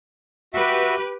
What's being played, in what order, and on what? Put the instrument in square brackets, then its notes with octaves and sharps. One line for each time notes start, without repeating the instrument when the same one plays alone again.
[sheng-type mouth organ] F#4 E5 [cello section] G4 B4